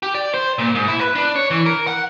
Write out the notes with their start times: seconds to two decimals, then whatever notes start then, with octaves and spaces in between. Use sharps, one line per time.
0.03 G4
0.15 D5
0.34 C5
0.58 A#2
0.75 G#2
0.88 E4
1.01 B4
1.15 D4
1.36 C#5
1.51 E3
1.66 A#4
1.87 F#5